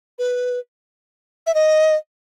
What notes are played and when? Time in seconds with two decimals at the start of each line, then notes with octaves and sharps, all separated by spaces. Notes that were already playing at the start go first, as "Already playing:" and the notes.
0.19 B4
1.47 E5
1.54 D#5